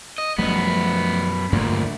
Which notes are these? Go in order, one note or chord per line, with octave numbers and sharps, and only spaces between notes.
D#5
F#2 F3 G3 A3 B3
D2 G2 A#2 A3 A#3